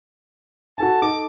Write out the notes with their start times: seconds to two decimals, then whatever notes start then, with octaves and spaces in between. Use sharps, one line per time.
0.78 F#4 A4 G#5 A5
1.02 D#4 A4 D6